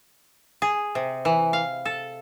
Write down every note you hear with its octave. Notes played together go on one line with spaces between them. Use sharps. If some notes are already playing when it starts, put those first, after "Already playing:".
G#4
C3
E3
F5
A4